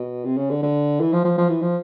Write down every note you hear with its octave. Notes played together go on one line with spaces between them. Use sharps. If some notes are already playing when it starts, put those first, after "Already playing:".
Already playing: B2
C3
C#3
D3
D3
E3
F3
F3
F3
E3
F3